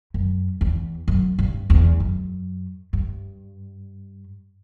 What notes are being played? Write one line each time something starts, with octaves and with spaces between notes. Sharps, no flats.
F#2
E2
F#2
G2
E2
F#2
G2